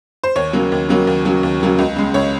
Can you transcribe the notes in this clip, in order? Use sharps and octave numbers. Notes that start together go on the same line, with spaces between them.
C5
D#2 C#5
C#3 F#3 A#3
D#2
C#3 F#3 A#3
D#2
C#3 F#3 A#3
D#2
C#3 F#3 A#3
C#2
C#3 G#3
C#2 C#5